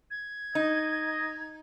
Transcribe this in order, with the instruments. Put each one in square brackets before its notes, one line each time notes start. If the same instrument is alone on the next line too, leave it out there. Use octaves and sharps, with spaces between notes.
[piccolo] G#6
[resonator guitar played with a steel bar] D#4 [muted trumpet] D#5